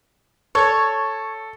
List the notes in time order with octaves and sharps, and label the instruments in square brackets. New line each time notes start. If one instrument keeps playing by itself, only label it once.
[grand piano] A4 [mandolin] C#5